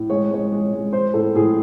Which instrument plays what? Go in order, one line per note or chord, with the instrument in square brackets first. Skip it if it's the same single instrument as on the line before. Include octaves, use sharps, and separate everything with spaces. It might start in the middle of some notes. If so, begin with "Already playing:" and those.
Already playing: [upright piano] A2
G#3 C#5
G#3 C#5
G#3
G#3
G#3 C5
A2 A4
A2 G#4